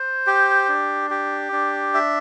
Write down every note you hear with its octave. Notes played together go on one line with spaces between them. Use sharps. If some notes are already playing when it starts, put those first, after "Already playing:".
Already playing: C5
G4
D4
G4
D4
E5